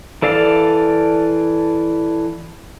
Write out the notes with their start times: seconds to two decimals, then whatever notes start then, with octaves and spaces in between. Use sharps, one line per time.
0.22 E3 A4 D5 F5